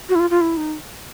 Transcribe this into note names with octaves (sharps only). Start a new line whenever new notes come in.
F#4
E4
F4
F4
E4
D#4